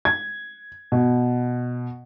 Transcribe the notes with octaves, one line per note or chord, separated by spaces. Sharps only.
G#6
B2